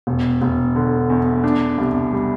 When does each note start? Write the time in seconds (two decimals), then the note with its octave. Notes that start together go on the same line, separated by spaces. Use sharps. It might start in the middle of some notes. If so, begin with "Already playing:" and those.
0.07 E1
0.42 E1
0.76 D3
1.10 E2
1.44 D4
1.78 C2
2.12 G3